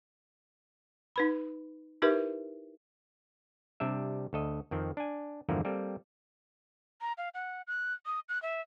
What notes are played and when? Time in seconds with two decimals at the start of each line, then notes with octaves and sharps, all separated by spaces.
1.16 D#4 B4 B5
2.02 D#4 E4 G4 A#4 B4 E5
3.80 C3 G3 D4 E5
4.33 D2 A4 D#5
4.71 F2 D#3 C4
4.97 D4 G#5
5.49 E2 G2 D3 F3 A#3
5.65 G3 A#3 C4 A4
7.01 A#5
7.18 F5
7.34 F#5
7.67 F#6
8.06 D#6
8.29 F#6
8.42 E5